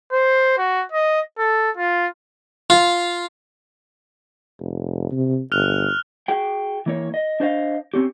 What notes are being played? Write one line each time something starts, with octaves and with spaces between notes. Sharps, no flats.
C5
F#4
D#5
A4
F4
F4
F1
C3
G1 F6 F#6 F7
F#4 G#4 G5
E3 A#3 C#5
D#5
D4 C5 D#5 F5
C4 C#4 G4